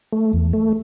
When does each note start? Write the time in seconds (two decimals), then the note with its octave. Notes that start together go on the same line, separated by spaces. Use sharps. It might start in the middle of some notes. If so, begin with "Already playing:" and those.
0.12 A3
0.33 E2
0.53 A3